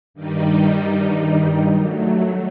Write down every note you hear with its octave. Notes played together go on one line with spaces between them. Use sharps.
G2 D#3 G3 D#4
F#3 A3